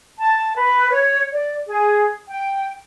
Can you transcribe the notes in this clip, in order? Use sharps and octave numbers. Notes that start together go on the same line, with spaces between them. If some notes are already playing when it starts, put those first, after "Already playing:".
A5
B4
C#5
D5
G#4
G5